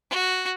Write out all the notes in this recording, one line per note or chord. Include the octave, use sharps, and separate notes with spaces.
F#4